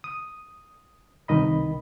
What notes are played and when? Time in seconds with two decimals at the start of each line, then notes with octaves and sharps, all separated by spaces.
0.04 D#6
1.28 C2 D#3 D#5 B5